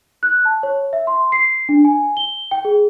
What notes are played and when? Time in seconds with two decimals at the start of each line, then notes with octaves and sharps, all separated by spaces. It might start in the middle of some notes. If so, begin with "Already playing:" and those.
0.23 F#6
0.45 A5
0.63 C#5
0.93 E5
1.07 C6
1.32 C7
1.69 D4
1.85 G#5
2.17 G7
2.51 G5
2.65 G#4